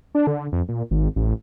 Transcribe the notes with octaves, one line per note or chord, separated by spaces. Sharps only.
D4
D3
F2
A#2
G#1
A1